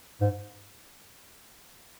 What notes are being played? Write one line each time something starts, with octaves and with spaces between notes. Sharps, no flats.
G#2